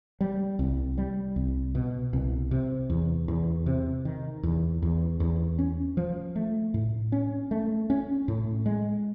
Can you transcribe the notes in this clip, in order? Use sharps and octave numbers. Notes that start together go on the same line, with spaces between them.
G3
C2
G3
C2
B2
C2
C3
E2
E2
C3
D#3
E2
E2
E2
C#4
F3
A3
A2
C#4
A3
C#4
A2
G#3